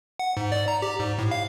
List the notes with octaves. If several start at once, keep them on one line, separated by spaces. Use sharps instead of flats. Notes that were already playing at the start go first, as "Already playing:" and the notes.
F#5
G#2
D5
A#5
G4
G#2
A2
F5